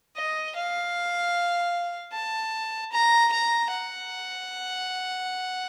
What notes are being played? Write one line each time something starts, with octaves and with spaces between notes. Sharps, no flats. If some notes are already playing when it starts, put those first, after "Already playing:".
D#5
F5
A5
A#5
A#5
F#5